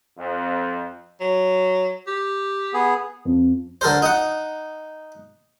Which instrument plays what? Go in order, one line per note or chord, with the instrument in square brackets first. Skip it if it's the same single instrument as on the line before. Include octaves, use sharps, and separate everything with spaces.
[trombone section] F2
[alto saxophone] F#3
G4
[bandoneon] B3 G#4
[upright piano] F2
[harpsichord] D3 A4 A#4 C5
D#4 F#5